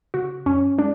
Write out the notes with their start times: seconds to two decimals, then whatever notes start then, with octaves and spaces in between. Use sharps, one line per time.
0.14 C#3 F#4
0.46 F#2 C#4
0.78 G#3 D4